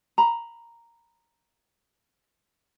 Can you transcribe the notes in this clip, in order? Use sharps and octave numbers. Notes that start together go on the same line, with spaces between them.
A#5 B5